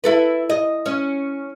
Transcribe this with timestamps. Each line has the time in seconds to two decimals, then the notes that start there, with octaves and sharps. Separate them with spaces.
0.04 E4 A4 B4
0.50 D#5
0.86 C#4